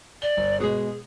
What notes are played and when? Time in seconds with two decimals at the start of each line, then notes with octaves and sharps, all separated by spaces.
0.22 D5 G7
0.37 G1
0.60 B2 G#3 G#4